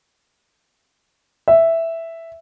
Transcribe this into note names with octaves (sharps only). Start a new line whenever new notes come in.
E5